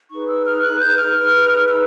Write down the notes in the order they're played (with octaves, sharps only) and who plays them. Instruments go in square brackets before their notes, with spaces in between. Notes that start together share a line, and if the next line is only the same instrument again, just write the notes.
[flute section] D#4 G#4 B4 C#6
E6
F6
F#6
G6
F6
D#4 G#4 B4
E6